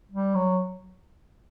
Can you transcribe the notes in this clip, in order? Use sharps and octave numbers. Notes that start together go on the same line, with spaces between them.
G3
F#3